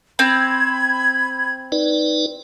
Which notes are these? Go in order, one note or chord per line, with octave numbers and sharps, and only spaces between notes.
C4 B5 G#6
D#4 B4 D5